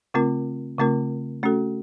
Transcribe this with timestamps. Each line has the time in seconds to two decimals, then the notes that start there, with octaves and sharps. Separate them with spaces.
0.14 C#3 A3 C4 F4 A#4
0.79 C#3 A3 C4 F4 A#4
1.43 A3 C#4 F#4 A4